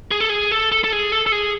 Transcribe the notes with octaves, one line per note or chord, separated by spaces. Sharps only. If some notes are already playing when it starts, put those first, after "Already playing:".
G#4
A4
G#4
A4
A4
A4
G#4
A4
A4
G#4